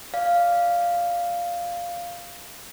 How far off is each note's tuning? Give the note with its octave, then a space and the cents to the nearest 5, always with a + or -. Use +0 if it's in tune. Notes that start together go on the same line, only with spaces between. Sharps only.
D5 -10 F5 -5